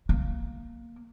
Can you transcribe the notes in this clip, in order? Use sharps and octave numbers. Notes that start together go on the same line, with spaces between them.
A#3